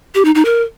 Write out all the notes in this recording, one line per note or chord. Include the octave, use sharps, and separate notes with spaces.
G4
D#4
D#4
A#4